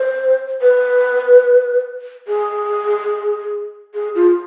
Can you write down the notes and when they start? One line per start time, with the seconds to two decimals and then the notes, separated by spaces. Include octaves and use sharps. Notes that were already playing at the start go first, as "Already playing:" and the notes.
Already playing: C5
0.61 B4
2.27 G#4
3.94 G#4
4.15 F4